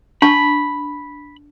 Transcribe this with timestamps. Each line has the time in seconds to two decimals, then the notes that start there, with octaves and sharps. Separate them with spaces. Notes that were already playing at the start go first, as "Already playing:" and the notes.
0.22 D4 A5 B5 C#6